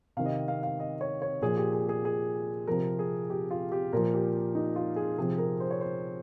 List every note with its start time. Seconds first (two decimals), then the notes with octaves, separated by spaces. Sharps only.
0.17 C3 D#3 F5
0.25 D#5
0.32 F5
0.48 F5
0.63 F5
0.80 D#5
1.01 C#5
1.22 C#5
1.42 A#2 F3 G#4
1.57 G4
1.73 G#4
1.89 G#4
2.05 G#4
2.68 C3 F3 A#4
2.99 G#4
3.30 G4
3.51 F4
3.72 G4
3.93 A#2 F3 A#4
4.14 G4
4.55 D#4
4.76 F4
4.96 G#4
5.18 C3 F3 G#4
5.38 A#4
5.60 C5
5.71 C#5
5.81 C5